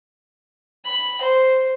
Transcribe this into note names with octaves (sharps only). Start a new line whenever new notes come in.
B5
C5